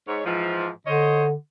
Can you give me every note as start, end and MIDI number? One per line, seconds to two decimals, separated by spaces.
0.08 0.22 44
0.08 0.22 73
0.25 0.68 44
0.25 0.68 52
0.25 0.68 53
0.87 1.33 50
0.87 1.25 72
0.87 1.25 73
0.87 1.25 75